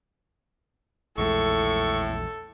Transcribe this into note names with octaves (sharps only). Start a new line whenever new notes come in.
A#1 E2 A2 G#3 A4 C#6